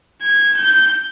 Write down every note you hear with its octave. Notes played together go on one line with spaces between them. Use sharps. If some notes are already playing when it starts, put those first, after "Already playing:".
G#6
G6